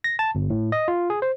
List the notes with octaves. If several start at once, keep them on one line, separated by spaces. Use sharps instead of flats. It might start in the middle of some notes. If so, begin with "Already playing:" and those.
A#6
A5
G1
A2
D#5
F4
G#4
C5